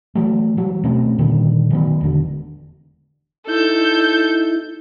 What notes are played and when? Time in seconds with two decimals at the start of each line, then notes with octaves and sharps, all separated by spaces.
0.15 E3 F#3 A3
0.57 E3 F#3 G3
0.84 B2 A3 C4 C#4
1.18 A#2 D3 D#3 G3
1.70 D#3 F#3 B3
2.01 E1 D3
3.47 D#4 E4 A4 G6